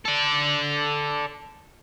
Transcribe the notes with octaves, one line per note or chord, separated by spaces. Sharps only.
A4 D5